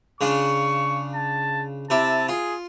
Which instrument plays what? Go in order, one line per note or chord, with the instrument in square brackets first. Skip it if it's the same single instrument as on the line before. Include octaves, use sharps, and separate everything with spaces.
[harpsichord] C#3 D4 F4 [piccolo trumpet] C#6
[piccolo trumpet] A5
[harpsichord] C3 E4 D6 [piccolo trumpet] A5
[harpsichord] F4 [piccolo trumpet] G#4